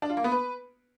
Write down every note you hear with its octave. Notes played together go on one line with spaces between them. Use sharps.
D4
F4
A#3
B3
B4